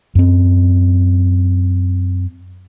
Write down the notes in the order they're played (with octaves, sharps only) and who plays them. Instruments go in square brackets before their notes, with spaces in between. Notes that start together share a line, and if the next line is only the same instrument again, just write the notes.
[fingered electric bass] F#2 C4